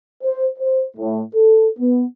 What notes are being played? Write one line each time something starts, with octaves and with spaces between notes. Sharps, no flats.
C5
C5
A2
A4
B3